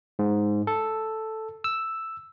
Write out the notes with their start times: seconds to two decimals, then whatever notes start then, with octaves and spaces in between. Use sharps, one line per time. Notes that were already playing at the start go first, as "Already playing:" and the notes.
0.19 G#2
0.67 A4
1.64 E6